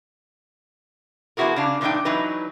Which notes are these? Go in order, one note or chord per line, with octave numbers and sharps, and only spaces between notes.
F3 B3 E4 F#4 G#4 A#4
C#3 D4 F5
A#2 D#3 E3 D4 D#4 G5
E3 F#3 D#4 B4